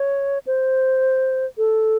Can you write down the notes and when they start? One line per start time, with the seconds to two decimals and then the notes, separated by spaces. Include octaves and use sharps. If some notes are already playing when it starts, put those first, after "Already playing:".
Already playing: C#5
0.47 C5
1.58 A4